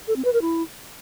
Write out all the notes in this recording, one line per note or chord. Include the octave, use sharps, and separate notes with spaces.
A4
C4
B4
A#4
E4